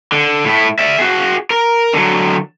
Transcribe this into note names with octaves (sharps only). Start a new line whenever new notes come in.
D3
A2 E4
D5 E5
F#4 G#4
A#4
D3 F#3